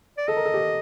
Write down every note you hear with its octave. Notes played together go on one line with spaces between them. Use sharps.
D5
A4 D#5
A#4
A4
G4